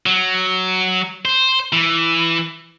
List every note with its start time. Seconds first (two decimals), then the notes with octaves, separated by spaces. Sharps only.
0.06 F#3
1.25 C5
1.73 E3